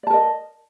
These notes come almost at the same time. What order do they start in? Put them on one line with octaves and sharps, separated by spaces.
D5 A5 A#4 D#5